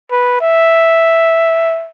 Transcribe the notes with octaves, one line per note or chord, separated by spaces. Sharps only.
B4
E5